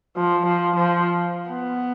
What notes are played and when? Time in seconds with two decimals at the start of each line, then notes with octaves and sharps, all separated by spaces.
0.17 F3
0.46 F3
0.76 F3
1.50 B3